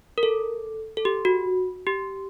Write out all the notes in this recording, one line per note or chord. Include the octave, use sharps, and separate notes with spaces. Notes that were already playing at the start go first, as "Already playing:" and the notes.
A#4
A4
A4
G4
F#4
G4